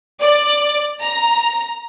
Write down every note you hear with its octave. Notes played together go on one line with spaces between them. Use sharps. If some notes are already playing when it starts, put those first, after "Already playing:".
D5
A#5